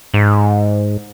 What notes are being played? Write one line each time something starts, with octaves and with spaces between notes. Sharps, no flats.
G#2